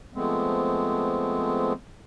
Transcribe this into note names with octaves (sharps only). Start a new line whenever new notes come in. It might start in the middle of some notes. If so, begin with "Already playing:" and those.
F3 G#3 A3 B3 C4